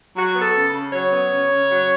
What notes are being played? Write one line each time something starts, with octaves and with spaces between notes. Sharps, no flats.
F#3 F#4
B3
A4
C#3
C#3
F#3 C#5
B3
C#3
C#3
F#3